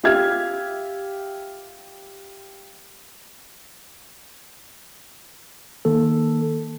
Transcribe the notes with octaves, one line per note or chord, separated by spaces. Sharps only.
F4 G4 E5 F6 G#6
D#3 A#3 A4